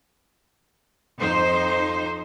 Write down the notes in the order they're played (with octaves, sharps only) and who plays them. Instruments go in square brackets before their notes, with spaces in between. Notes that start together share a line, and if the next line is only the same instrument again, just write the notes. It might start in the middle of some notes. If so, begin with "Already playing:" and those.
[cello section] F2 D#4 C5